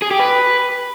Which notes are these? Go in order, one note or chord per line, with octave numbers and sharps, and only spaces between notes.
G#4
G4
B4